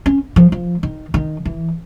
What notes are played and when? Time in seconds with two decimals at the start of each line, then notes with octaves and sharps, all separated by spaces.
0.06 C#4
0.36 F3
0.52 F3
0.83 D#3
1.14 D#3
1.45 E3